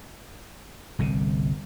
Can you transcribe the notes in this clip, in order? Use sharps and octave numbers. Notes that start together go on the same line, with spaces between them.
G1 C2 C3